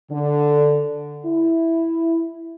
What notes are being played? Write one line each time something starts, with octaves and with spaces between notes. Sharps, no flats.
D3
E4